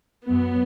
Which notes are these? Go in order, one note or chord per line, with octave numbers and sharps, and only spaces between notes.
F#2 F#3 B3